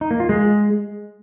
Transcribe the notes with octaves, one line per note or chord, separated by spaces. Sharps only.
D#4
A#3
F4
G#3